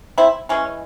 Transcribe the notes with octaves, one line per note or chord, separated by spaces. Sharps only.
C4 E4
E3 G#3 C#4